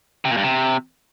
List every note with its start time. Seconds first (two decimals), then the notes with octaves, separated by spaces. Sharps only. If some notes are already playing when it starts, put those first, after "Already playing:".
0.25 C3
0.31 A#2
0.37 G2
0.43 C3